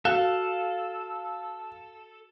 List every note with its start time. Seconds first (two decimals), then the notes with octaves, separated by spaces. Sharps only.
0.05 F#4 A4 F5